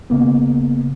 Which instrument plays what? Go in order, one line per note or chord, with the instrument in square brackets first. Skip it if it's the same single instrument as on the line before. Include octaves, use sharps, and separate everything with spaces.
[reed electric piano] C#3 A#3 B3